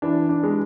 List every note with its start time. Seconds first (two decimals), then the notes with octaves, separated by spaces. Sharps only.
0.02 E3 D4
0.29 D4
0.43 G#3